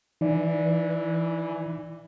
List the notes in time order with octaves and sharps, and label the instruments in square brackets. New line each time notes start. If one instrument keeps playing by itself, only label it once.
[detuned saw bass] E3 [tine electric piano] D#4 D5